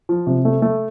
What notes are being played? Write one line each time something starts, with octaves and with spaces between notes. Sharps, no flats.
F3
C3
A3
A3